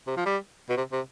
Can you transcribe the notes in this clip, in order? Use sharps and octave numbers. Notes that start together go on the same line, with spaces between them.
C3
F3
G3
B2
C3
C3